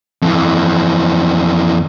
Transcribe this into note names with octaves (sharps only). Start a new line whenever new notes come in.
F2 E3